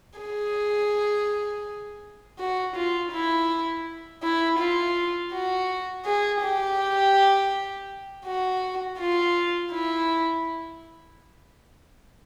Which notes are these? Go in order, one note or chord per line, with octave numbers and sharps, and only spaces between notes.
G#4
F#4
F4
E4
E4
F4
F#4
G#4
G4
F#4
F4
E4